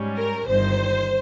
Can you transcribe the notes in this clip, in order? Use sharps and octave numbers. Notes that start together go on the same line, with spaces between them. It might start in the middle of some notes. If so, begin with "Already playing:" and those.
Already playing: G#2 G3 C#4
A#4
G1 G2 D#3 C5